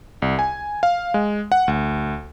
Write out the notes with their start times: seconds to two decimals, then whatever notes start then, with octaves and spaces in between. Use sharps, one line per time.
0.22 C2
0.39 G#5
0.83 F5
1.14 G#3
1.52 F#5
1.68 D2